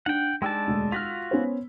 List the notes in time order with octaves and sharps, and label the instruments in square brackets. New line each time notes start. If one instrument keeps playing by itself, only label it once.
[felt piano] D4 [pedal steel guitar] F#5 G5
[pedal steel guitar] G#3 D4 A5 [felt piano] G5 E6
[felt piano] E1 D2
[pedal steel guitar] F4 F#4 F6 [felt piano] B6
[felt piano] B3 C#4 C5